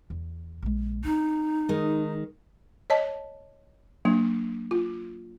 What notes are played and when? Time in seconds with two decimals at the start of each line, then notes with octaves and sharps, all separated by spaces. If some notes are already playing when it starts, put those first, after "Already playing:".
0.10 E2
0.63 A#1 G#3
1.04 C4 D4 D#4
1.69 D#3 G#3
2.90 C#5 D#5 A5
4.05 F#3 A#3 D4
4.71 F4